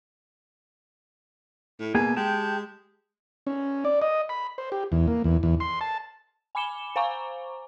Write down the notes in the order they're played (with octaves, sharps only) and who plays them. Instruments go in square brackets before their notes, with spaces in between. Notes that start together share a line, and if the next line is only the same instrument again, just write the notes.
[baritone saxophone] A2
[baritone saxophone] B2 [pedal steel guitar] A#3 G#4 G#5
[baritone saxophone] G#3 [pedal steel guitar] G4 G5 A5
[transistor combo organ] C#4
D5
D#5
B5
C5
G4
E2
A#3
E2
E2
C6
A5
[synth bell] G#5 B5 D6 C#7 E7 G7
C5 F5 G#5 A#5 C#6 D6